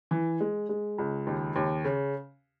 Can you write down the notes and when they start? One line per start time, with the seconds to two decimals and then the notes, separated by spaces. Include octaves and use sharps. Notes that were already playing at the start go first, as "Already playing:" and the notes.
0.11 E3
0.40 G#3
0.69 G#3
0.98 C#2
1.27 D#2
1.56 D#2
1.84 C#3